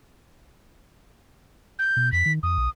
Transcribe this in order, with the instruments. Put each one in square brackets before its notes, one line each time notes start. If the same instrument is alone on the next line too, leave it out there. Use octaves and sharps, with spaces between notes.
[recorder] G6
[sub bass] B2
[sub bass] F2 [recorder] B6
[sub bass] D#3
[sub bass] F2 [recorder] D#6
[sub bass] B1